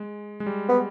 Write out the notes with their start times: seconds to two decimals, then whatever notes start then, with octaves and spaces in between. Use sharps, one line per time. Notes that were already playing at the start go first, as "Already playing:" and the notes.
Already playing: G#3
0.40 G#3
0.46 G3
0.69 B3